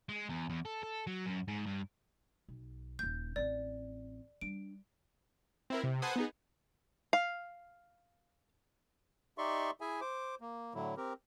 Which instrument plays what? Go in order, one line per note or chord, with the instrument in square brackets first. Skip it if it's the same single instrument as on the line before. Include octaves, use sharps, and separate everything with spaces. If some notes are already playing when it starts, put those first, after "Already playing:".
[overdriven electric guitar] G#3
E2
E2
A4
A4
F#3
F#2
G#2
G2
[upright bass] B1
[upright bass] D#1 A#3 [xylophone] G6
[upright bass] A1 C4 [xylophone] D5
[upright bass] G3 D4 [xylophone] D7
[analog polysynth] C4 E4 A#4
C3
A4 B4 C5 F#5 G#5 D#6
B3 D#4 G#4
[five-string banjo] F5
[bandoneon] D#4 G4 D5 E5 C6 C#6
E4 G#4 E5 G#5
C5 D6
A#3
A2 D3 F#3 E4
C4 G4 A#4